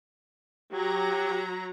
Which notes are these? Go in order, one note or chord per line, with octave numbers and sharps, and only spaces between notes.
F#3 G4 A#5